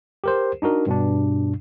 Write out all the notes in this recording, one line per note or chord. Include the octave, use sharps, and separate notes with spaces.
G4 A#4 C5
D4 D#4 F#4 A#4
G2 B2 D4